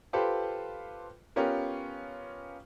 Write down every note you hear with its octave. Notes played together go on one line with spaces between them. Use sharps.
F4 G4 A4 B4 C5
B3 C#4 F4 G4 A#4